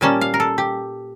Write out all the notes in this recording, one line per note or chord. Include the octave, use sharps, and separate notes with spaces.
A#2 G3 A#3 C#4 A5
F5
A#4
A4
G4